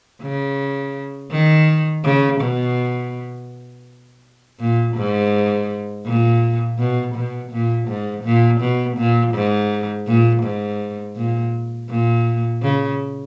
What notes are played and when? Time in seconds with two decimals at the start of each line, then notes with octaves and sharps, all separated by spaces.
0.22 C#3
1.31 D#3
2.04 C#3
2.41 B2
4.59 A#2
4.96 G#2
6.05 A#2
6.78 B2
7.15 B2
7.51 A#2
7.88 G#2
8.24 A#2
8.61 B2
8.97 A#2
9.34 G#2
10.07 A#2
10.43 G#2
11.16 A#2
11.89 A#2
12.62 C#3